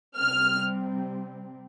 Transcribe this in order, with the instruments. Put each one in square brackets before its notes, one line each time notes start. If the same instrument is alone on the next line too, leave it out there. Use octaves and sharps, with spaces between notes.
[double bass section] C3 G3 C4 [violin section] F6